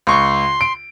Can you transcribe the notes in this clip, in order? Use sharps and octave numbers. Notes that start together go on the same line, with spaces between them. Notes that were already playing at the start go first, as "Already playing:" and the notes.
C#2 C6 C#6
D7